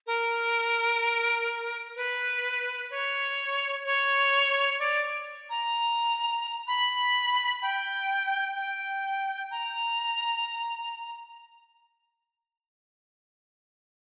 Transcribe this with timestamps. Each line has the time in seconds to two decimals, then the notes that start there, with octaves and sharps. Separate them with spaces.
0.07 A#4
1.96 B4
2.90 C#5
3.85 C#5
4.79 D5
5.50 A#5
6.68 B5
7.62 G5
8.57 G5
9.51 A#5